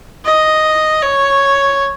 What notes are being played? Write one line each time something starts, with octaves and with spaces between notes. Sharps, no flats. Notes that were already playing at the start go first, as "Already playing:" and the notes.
D#5
C#5